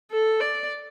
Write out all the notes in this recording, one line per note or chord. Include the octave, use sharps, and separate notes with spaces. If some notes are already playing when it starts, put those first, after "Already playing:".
A4
D5